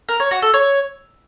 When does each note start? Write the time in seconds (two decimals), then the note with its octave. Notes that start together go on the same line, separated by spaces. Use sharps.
0.09 A#4
0.20 C#5
0.31 F#4
0.42 A4
0.54 C#5